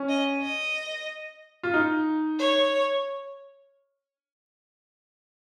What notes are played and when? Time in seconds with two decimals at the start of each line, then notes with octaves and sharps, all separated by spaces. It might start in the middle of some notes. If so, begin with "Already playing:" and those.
Already playing: C#4
0.09 D#5
0.42 D#5
1.63 F4
1.74 D#4
2.39 C#5